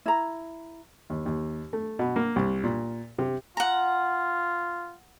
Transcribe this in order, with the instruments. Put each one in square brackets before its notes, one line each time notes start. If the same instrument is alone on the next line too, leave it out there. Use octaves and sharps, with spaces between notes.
[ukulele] E4 A#5
[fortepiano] D#2
D#2
A3
B2
A#3
C2
A#2
C3
[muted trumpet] F4 [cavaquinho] F#5 A#5